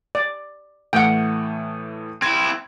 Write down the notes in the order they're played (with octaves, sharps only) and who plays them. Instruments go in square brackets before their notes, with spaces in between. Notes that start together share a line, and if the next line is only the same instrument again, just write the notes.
[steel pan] D5
[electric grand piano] A2 E3 A3 [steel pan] F#5 G5
[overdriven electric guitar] C4 E4 [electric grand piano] G#6